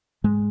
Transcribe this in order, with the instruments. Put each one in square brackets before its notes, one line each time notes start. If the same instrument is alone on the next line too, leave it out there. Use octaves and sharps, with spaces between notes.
[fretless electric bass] G#2 G#3